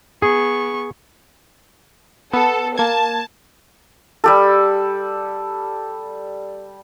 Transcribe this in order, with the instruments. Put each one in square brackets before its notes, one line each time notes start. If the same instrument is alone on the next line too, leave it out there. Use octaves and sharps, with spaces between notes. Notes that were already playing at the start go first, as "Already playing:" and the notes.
[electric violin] B3 C#6 [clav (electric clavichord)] G#4
[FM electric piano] B3 [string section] A4
[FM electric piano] A#3 G#6 [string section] A5
[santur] G3 G4 A4